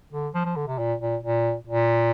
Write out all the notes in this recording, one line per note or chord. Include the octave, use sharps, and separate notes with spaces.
D3
F3
F3
D3
C3
A#2
A#2
A#2
A#2